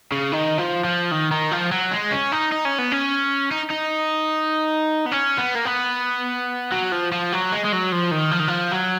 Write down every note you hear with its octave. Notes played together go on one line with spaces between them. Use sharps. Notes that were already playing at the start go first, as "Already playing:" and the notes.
C#3
D#3
F3
F3
D#3
D#3
F3
F#3
G#3
C#4
D#4
D#4
C#4
B3
C#4
D#4
D#4
B3
C#4
B3
A#3
B3
F#3
F3
F3
F#3
G#3
G#3
F#3
F3
D#3
F3
D#3
F3
F#3